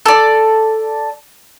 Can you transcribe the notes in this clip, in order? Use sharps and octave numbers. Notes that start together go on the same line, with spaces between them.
A4 D5